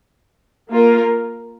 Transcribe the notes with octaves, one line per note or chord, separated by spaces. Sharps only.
A#3 F4 A#4